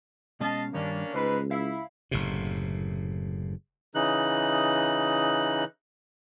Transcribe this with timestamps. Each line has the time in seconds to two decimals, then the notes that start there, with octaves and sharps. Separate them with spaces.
0.40 B2 G#3 C#4 D#5 F5 A5
0.73 G2 D#3 G3 A#3 C#4 D4
1.14 C#2 G#2 B4 C5
1.51 E4 F5
2.11 F#1 A2 C3
3.95 C#3 E3 D#4 F#6